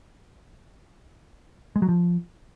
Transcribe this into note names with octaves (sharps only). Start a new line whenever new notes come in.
G#3
F#3
F3